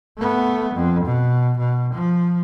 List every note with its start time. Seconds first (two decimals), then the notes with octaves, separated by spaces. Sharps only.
0.18 A3 B3
0.74 F2
1.05 B2
1.59 B2
1.94 F3